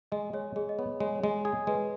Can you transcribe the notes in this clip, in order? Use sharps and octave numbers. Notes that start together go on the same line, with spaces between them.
G#3 D#5
G#3 C#5
G#3 G#4
D#5
B3 C#5
G#3 C#5
C#5
G#3 D#5
G#4
G#3 B4